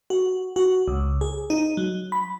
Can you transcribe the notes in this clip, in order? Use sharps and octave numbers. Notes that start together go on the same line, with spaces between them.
F#4
F#4
C#2
G#4
D#4
F#3
B5